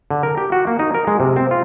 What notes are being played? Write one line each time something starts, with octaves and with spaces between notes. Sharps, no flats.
D3
A#4
G4
F#4
A#3
D#4
A#4
G#3
C3
C4
F4